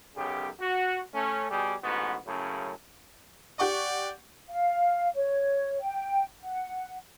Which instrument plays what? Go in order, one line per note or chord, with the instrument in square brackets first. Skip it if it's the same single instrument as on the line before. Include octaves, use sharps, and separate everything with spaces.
[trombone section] B1 F#2 C#3 G4
F#4
A3 C#4
B2 G3 G4 G#4
A1 G#2 B3 F#4
F#2 A2 C#3
[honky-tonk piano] G4 F#5 C#6 [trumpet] D5
[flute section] F5
C#5
G5
F#5